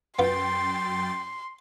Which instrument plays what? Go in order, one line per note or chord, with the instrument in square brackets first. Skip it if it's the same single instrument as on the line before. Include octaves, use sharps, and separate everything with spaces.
[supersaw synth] F#2 G5 A6 [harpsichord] B3 F4 [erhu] C6